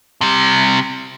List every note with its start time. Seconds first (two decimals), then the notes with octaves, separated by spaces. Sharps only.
0.21 C3 G3